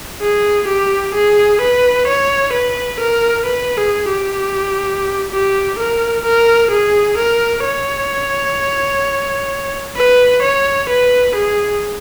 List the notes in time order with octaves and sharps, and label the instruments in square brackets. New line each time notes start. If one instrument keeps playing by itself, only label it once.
[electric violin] G#4
G4
G#4
B4
C#5
B4
A#4
B4
G#4
G4
G4
A#4
A#4
G#4
A#4
C#5
B4
C#5
B4
G#4